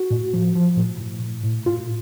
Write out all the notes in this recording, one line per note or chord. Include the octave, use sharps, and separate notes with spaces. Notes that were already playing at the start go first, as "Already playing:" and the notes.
Already playing: F#4
A2
F3
F3
A2
A2
A2
A2
A2 F4